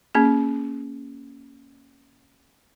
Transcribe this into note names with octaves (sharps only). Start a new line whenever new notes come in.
A#3 C#4 G#4